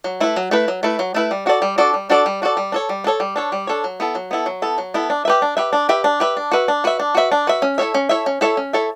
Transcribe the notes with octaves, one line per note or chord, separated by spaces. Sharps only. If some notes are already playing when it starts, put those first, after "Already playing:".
F#3
A3 E4 B4
F#3
A3 E4 B4
F#3
A3 E4 B4
F#3
A3 E4 B4
G3
D4 F#4 A4 D5
G3
D4 F#4 A4 D5
G3
D4 F#4 A4 D5
G3
D4 F#4 A4 D5
G3
D4 A4 C#5
G3
D4 A4 C#5
G3
D4 A4 C#5
G3
D4 A4 C#5
F#3
B3 E4 A4
F#3
B3 E4 A4
F#3
B3 E4 A4
F#3
B3 E4 A4
D4
G4 B4 E5
D4
G4 B4 E5
D4
G4 B4 E5
D4
G4 B4 E5
D4
F#4 B4 E5
D4
F#4 B4 E5
D4
F#4 B4 E5
D4
F#4 B4 E5
C#4
E4 A4 C#5 E5
C#4
E4 A4 C#5 E5
C#4
E4 A4 C#5 E5
C#4
E4 A4 C#5 E5